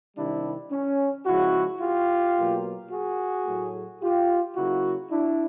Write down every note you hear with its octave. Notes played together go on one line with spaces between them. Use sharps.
C3 D#3 G3 C4 D4 E4
C#4
C#3 F3 G#3 E4 F#4
F4 G4
B2 F#3 A#3
F#4 G#4
A2 F#3 A3
F4 G4
C#3 F#3 A#3 E4 F#4
D4 E4